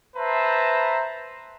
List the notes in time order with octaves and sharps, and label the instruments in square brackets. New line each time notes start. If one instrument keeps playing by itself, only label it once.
[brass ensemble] B4 C5 E5 A5 A#5